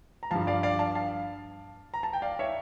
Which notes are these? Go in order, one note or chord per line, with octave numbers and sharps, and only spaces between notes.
A#5
G2 F3 F5 A5
D5 F5
D5 F5
F5 A5
F5 A5
A#5
A5
G5
D5 F5
C#5 E5